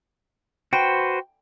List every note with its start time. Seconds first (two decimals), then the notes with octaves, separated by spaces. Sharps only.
0.73 F#4 B4 C5 G5